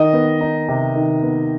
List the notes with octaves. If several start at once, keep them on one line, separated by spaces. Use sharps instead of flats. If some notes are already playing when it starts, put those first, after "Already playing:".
Already playing: D#3 D#5
B3
D#4
C3
D#3
B3